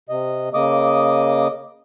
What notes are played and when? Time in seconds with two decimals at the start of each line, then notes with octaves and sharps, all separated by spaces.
0.09 C3 D#5
0.54 C#3 A#3 D#5 D6 D#6